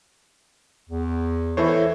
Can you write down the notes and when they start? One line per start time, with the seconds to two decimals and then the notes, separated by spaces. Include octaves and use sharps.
0.89 E2
1.57 E3 E4 A4 C5 C#5